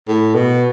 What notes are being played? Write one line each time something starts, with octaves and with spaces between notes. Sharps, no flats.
A2
B2